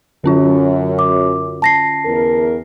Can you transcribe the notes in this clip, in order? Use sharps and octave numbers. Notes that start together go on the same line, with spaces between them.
F#2 D3 C#4 F4
D6
A5 A#6 C7
E2 A#4